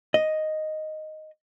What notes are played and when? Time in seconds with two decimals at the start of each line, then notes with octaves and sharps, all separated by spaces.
0.14 D#5